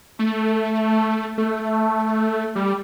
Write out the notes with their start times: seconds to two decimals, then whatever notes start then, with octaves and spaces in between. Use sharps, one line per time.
0.19 A3
1.38 A3
2.55 G3